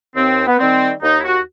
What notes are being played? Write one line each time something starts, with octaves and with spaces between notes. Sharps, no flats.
D#2 C4
B3
D#3 G3 C4
D#2 D#4
E4
F#4